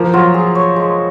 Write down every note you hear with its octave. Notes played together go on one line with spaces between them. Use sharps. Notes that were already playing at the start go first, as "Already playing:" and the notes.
Already playing: F3 A#3
F#3 F4
G#4
C#5
G#3